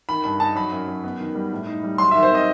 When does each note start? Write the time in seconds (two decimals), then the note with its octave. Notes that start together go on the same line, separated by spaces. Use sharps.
0.09 D#3 B5
0.24 G2 B5
0.40 D#4 A5
0.55 F#3 B5
0.72 F#2
0.88 F#3
1.04 B3
1.20 D#3
1.35 G3
1.52 A2
1.67 D#4
1.84 G3
1.98 F#3 C6
2.11 D#3 E5
2.23 C5
2.30 C4 D#5